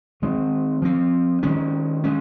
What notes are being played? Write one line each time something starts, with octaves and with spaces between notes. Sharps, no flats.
D#3 G#3 C4
F3 C4
D#3 G#3 C#4
G#3 C#4